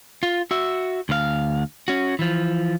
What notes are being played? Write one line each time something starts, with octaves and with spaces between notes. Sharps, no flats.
F4
F#4 E5
D2 F5
C#4 F#4
E3 F3